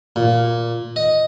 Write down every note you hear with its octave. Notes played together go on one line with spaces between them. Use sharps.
A#2
D#5